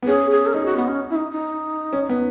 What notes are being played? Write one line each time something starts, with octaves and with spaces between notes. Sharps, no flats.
B3
C#4 G#4
G#4
A#4
D#4 G#4
F#4
B3
C#4
E4
D#4
D#4
C#4
B3